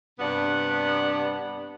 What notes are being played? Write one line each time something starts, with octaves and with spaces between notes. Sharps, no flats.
G2 C3 B3 D4 D5 F#5